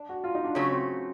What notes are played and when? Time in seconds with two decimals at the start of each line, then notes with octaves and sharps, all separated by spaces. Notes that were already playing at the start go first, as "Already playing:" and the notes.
Already playing: D4
0.09 F#4
0.24 F4
0.35 D#4
0.44 D4
0.55 C#3 F#3 A3 C#4
0.71 C4